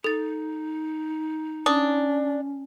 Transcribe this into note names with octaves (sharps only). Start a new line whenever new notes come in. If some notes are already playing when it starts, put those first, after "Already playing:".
D#4 A4 A6
C#4 D4 D#6